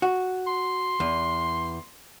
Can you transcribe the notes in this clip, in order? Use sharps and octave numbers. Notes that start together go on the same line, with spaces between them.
F#4
C6
E2